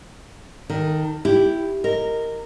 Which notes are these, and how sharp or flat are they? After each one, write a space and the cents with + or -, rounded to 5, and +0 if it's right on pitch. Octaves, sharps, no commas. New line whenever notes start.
D#3 +0 A4 +30
E4 +0 G4 +0
A#4 -15 D#5 -5